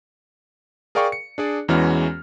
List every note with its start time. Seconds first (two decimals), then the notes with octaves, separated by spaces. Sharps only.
0.95 G#4 A#4 D5 F5 G5 C#6
1.12 C#7
1.38 D4 G#4 D5
1.69 E2 E3 G#3 C#4 F#4 F6